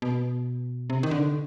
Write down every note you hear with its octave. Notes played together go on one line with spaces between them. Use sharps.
B2
C3
D#3
D3